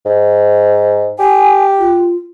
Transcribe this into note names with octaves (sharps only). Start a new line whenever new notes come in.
G#2
G4 G#5
F4